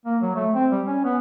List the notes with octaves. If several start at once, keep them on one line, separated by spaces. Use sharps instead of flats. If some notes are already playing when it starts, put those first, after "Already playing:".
A#3
F#3
A3
C4
G3
C#4
B3